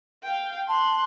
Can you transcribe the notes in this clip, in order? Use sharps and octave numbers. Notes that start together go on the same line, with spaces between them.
F5 G5
A5 C6 F#6